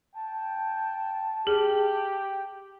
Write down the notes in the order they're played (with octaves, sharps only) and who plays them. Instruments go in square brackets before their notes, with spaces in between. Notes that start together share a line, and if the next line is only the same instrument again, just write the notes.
[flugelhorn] G5 [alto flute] A5
[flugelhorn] G4 [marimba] G#4